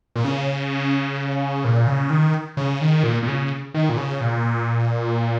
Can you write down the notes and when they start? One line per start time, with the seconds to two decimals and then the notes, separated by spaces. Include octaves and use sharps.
0.16 A#2
0.25 C#3
1.65 A#2
1.87 C#3
2.10 D#3
2.57 C#3
2.81 D#3
3.03 A#2
3.23 A#2
3.28 C#3
3.74 D#3
3.89 A#2
3.97 C#3
4.21 A#2